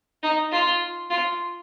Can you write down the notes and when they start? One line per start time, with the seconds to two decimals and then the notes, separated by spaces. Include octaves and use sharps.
0.23 D#4
0.52 F4
1.10 F4